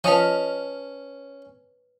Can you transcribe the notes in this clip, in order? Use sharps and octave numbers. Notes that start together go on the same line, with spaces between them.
F3 C#4 B4 C#5 D#5 A5 F6